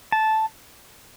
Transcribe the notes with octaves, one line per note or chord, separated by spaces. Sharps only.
A5